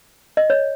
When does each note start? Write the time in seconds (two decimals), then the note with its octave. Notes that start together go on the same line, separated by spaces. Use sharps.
0.37 D#5
0.50 C#5